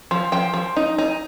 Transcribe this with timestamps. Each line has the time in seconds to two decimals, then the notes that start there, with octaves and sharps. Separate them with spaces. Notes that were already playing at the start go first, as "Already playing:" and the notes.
0.11 F3
0.32 F3 G5
0.54 F3
0.76 D#4
0.98 D#4